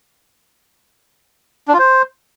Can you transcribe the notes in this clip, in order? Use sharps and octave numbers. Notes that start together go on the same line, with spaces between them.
D4
F4
C5